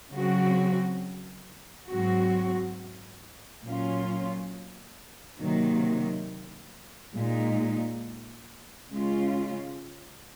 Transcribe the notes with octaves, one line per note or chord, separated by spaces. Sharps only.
C#3 F#3 C4 F#4
G#2 F#3 C4 F#4
A#2 F#3 C#4 F4
C3 D#3 F#3 A#3
A#2 G#3 D#4
C#3 G#3 C#4 F4